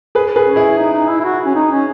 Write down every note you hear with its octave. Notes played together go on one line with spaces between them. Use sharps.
G#4 B4
G#4 B4
C#4
E4 G#4
D#4
D#4
E4
E4
F#4
C#4
D#4
C#4